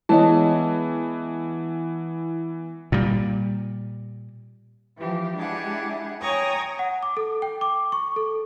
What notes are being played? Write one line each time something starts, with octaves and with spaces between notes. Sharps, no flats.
E3 G#3 B3 E4 C#5 D#5 A5
A#2 G3
E3 F3 G4
G#3 D4 E4 G4 G#4 F#5
C#5 G5 G#5 A#5 C#6 D#6
F#5
D6
A4
G5
D6
C#6
A4